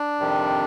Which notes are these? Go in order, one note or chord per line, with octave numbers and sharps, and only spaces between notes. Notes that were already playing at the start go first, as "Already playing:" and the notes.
Already playing: D4
F2 C3 D#3 G3